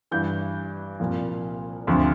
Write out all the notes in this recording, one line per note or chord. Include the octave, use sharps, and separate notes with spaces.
G2 E3 G6
C2 A#2 F3
D2 C3 F3